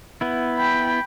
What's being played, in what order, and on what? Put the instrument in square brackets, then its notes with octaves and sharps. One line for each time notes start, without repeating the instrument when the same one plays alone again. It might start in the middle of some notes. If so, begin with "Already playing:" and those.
[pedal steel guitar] B3 E4
[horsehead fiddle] G5 B5